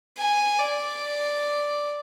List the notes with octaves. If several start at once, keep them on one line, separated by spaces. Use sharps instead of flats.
G#5
D5